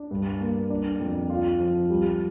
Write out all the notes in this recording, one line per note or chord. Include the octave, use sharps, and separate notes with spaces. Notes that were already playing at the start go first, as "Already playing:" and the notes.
Already playing: D4
G2
A#3
D4
F2
F4
F3
G3